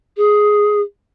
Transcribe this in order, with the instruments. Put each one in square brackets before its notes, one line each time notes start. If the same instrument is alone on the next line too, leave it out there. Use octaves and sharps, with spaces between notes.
[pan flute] G#4